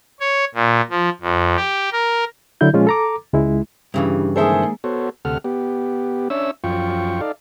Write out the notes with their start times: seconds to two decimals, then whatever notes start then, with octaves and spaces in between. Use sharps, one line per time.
0.20 C#5
0.55 A#2
0.90 F3
1.21 F2
1.56 G4
1.92 A#4
2.61 D3 F#3 E4 G6
2.73 A#2 F3 G#3 C#4 F4
2.87 A4 A#5 D6
3.33 C#2 G#3 E4
3.94 G2 C#3 E3 D4 E4 G4
4.36 D#3 G#3 A#3 G#4 A4 C5 E5 G#5
4.84 B3 F#4 A4 C5 C#5
5.25 D2 C3 A4 F#5 F6
5.44 B3 G4
6.30 C#4 D4 C#5 E5 E6
6.64 F#2 F3 F4 G5 C#6
7.21 D#4 A4 D5 F5